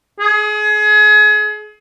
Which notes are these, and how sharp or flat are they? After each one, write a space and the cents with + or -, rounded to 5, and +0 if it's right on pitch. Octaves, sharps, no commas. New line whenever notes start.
G#4 +30